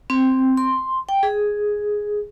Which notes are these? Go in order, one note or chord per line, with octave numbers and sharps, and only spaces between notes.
C4
C6
G5
G#4